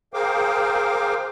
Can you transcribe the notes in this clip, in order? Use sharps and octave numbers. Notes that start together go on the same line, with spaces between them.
G#4 A#4 C5 F5 G5 D6